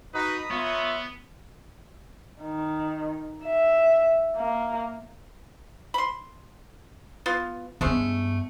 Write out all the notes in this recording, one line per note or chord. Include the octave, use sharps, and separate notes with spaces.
D#4 F#4 B4 A#5 B5 D#6
B3 F4 C#5 E5
D#3
E5
A#3
B5 C6
B3 F4
G2 G#3 A3 B3 C#4